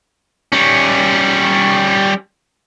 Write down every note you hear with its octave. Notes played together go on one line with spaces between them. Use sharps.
G3 C#4